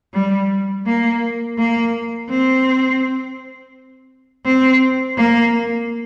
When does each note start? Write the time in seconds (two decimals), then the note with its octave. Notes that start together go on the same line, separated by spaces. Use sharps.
0.14 G3
0.86 A#3
1.58 A#3
2.30 C4
4.45 C4
5.17 A#3